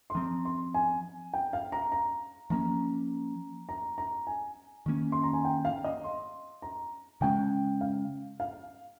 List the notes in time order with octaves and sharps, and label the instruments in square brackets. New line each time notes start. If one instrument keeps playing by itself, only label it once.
[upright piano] C6
[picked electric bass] F3 C4 [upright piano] A#5
[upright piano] C6
G#5
G5
F5
A#5
A#5
[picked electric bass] F3 A#3 C#4 [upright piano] A#5
[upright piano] A#5
A#5
G#5
[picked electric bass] D#3 A#3 C#4
[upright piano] C6
A#5
G#5
G5
F5
D#5
C6
A#5
[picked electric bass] C#3 G#3 C#4 [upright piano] G5
[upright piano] F5
F5